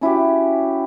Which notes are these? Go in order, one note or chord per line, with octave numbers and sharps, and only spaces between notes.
C#4 E4 F#4 G4